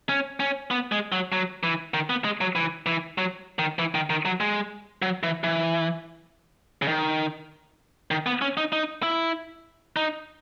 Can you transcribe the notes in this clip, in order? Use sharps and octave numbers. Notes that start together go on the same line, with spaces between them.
C#4
C#4
B3
G#3
F#3
F#3
E3
D#3
B3
G#3
F#3
E3
E3
F#3
D#3
E3
D#3
D#3
F#3
G#3
F#3
E3
E3
C#3
D#3
D#3
B3
C#4
D#4
D#4
E4
D#4